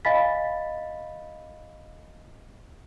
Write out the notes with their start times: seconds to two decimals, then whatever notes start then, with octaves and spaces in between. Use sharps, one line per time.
0.05 D#5 F5 G#5 B5 A6 B6